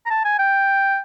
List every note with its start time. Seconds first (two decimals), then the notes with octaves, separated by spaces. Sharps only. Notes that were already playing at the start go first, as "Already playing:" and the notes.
0.06 A#5
0.10 A5
0.24 G#5
0.39 G5